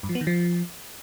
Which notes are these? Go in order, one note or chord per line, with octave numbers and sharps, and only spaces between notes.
G2
F3
B3
D#3
F3